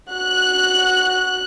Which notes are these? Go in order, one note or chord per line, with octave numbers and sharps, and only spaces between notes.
F#4 F#6